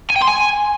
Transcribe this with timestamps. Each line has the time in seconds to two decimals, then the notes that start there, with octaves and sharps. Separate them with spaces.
0.10 G#5
0.16 G5
0.22 C6
0.28 G#5